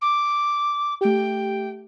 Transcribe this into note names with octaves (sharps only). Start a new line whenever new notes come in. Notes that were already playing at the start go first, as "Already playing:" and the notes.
D6
A3 G4 G5